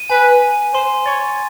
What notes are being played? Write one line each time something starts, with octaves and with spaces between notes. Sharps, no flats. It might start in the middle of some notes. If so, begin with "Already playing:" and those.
Already playing: D#7
B4 G#5
G#5
C5 C6
C#5 A6